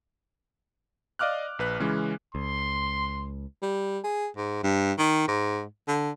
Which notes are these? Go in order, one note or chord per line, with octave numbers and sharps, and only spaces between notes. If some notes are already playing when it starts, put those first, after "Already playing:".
D5 D#5 F5 D6 F6 F#6
A#1 B4 F#6
C#3 E3 G#3 C#4
C#2 C6
G3
G#4
G#2
G2
D#3
G#2
D3